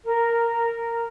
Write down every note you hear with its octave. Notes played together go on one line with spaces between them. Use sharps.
A#4